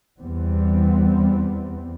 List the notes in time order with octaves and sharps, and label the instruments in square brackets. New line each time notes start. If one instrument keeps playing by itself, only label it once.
[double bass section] E2 G3 B3 C4